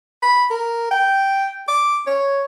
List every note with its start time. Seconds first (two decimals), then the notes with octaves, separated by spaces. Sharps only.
0.23 B5
0.50 A#4
0.91 G5
1.68 D6
2.06 C#5